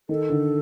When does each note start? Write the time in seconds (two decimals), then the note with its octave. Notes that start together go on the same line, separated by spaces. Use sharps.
0.09 D#3 A4
0.30 D3